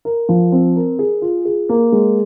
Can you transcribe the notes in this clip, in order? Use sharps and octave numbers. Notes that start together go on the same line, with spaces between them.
A#4
F3
C4
A#4
G#4
F4
G#4
A#3
G#3